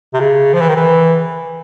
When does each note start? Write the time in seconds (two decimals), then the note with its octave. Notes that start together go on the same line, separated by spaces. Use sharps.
0.14 C3
0.20 C#3
0.54 F3
0.61 E3
0.69 D#3
0.76 E3